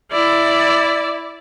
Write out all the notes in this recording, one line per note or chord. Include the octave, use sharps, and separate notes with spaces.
E4 D5